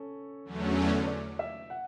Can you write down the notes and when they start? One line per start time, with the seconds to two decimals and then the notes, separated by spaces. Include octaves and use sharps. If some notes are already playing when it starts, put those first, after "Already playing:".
Already playing: C#4 A4
0.45 E2 D3 F#3 A3 C#4
1.07 D5
1.39 E5
1.70 F#5